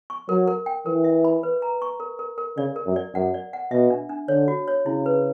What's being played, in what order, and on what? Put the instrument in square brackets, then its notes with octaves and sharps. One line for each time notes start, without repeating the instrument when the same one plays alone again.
[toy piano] C#6
[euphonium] F#3 [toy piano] A#4
[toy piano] A#4
G5
[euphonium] E3 [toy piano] A#4
[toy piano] E5
B5
B4
A#5
C#6
A#4
A#4
A#4
[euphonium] C#3 [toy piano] D5
[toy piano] A#4
[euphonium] F#2
[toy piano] D5
[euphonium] F#2 [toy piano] F#5
[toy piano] D5
F#5
[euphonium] B2 [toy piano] E5
[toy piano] D4
D4
[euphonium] D3 [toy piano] C#5
[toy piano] F#4
C#5
[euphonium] C#3 [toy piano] E4
[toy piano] B4